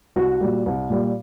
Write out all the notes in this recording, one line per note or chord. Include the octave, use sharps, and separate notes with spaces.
C2 F#4
A#2 G3
C2
A#2 G3